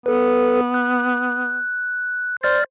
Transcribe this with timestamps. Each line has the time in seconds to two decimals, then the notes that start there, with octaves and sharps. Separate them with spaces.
0.06 B3 A4 B4
0.74 F#6
2.43 C5 D5 F6 A6